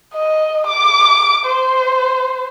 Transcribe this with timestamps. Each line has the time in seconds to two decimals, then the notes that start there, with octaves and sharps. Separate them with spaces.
0.15 D#5
0.67 D6
1.46 C5